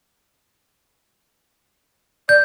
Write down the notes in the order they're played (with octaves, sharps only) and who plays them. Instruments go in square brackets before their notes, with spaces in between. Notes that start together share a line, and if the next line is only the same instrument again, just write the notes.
[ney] D5 [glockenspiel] G6